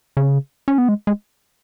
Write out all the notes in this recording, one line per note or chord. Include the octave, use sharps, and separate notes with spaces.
C#3
C#4
B3
G#3
G#3